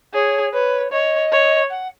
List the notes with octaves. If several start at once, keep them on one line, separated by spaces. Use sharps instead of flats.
G#4 C#5
B4 C#5
C#5 D#5
C#5
F#5